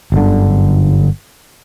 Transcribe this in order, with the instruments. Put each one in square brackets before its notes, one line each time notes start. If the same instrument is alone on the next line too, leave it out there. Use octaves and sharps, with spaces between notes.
[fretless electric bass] G1 F#2 D3